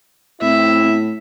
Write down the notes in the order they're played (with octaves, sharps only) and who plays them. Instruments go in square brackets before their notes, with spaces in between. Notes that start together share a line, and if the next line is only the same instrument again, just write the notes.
[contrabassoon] A2 [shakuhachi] C4 [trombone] E4 [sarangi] E5